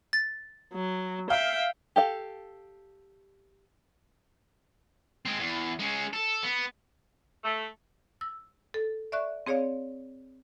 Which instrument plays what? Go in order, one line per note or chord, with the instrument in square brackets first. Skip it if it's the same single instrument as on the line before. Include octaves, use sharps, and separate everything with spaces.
[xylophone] A6
[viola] F#3
[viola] E5 G5 [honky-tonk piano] F5
[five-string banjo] G4 A4 F5
[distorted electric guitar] G#3 C4
E2
G#3 C#4
A4
B3
[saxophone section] A3
[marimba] E6
A4
D5 E5 C#6 F#6
C4 G#4 C#5 D5 F5